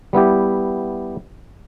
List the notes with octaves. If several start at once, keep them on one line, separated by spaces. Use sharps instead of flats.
G3 B3 E4 G4